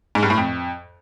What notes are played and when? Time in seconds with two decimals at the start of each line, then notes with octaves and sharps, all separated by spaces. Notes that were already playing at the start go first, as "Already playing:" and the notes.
0.15 G#2
0.23 G2
0.30 A2
0.38 F2